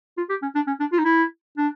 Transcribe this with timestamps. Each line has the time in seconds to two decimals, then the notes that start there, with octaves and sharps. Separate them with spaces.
0.18 F4
0.30 G4
0.42 C#4
0.55 D4
0.67 C#4
0.80 D4
0.92 F4
0.99 D#4
1.05 E4
1.58 D4